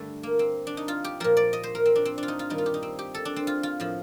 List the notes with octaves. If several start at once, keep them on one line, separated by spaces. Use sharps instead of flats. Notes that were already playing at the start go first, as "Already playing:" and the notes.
Already playing: G2 D3 G3 A3
A#3
C4
D4
D#4
F4
G4
A#2 F3 A#4
D5
D#5
C5
A#4
C4
D4
C4
D4 F4
D#4
F4
G2 D#3 G3 D#4
F4
G4
D#4
C4
G4
A4
D4
C4
F4
F4
A2 F3